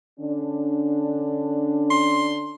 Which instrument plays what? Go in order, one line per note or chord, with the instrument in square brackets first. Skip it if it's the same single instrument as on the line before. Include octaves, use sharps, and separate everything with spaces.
[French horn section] D3 C#4 D4
[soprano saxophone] C6